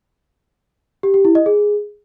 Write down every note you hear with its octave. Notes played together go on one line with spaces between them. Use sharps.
G4
G4
E4
D#5
G#4